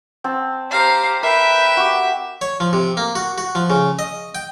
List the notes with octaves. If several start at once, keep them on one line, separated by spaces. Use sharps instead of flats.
C4 A5
G4 C5 F5 A#5
A#4 B4 E5 G5
F#4 G4
C#5
F3
C3
A#3
F#4
F#4
F3
C#3
D#5
G5